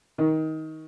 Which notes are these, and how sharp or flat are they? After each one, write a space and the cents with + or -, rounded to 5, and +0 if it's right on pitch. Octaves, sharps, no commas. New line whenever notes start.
D#3 +20